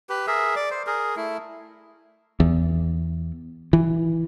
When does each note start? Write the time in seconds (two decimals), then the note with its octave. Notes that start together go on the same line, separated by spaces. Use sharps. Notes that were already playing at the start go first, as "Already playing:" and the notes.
0.09 G4 B4
0.27 G#4 A#4 E5
0.56 D5
0.71 C5
0.87 G#4 A#4
1.17 A3 E4
2.40 E2
3.73 E3